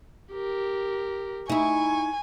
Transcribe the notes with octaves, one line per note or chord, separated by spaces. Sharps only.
G4 A#4
D#4 E4 G#5 C#6